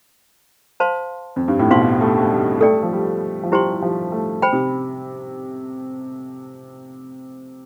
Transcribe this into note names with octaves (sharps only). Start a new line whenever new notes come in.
C5 F5 A5 C6
F2
G2
A2
B2 C5 F5 C6
A3
A3
G3
A3 A4 D5 G5
G3
F3
G3
F3
G3 E4 G4 C5 G5 C6
F3
A3
C5 G5 B5
C3